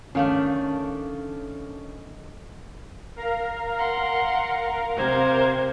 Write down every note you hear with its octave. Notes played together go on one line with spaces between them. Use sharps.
D#3 A3 C#4 D4 F5
A#4 F5 A#5
F#5 C6
C3 C5 G#6